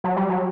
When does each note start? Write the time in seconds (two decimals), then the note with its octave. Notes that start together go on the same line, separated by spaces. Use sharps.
0.04 F#3
0.16 G3
0.29 F#3